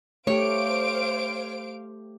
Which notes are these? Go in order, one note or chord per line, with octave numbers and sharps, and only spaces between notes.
A3 G4 C5 C#5 F5 D7